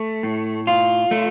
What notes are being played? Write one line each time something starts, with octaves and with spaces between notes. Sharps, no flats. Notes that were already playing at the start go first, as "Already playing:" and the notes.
Already playing: A3
A2
F4
A3